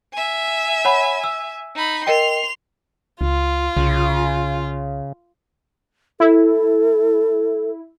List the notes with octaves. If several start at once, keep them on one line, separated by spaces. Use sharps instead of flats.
E5 G#5
C#5 F#5 B5
E6
D#4 B5
A#4 D#5 G5 C6 F7
C#2 F4
C2 C#3
E4 A4